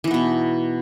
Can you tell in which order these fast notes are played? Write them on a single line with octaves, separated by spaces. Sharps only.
E3 D#4 B3 B2